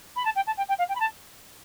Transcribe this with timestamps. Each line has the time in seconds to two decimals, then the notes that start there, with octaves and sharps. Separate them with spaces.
0.16 B5
0.25 A5
0.36 G5
0.47 A5
0.57 G5
0.69 G5
0.79 F5
0.89 G5
0.95 B5
1.00 A5